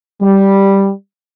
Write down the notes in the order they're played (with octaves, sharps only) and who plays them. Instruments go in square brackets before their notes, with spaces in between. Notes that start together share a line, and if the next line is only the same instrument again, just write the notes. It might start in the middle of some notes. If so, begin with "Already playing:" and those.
[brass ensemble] G3